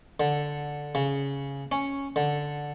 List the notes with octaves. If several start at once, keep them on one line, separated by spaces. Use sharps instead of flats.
D3
C#3
C#4
D3